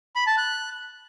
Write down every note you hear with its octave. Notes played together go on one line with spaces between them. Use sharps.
B5
A5
F#6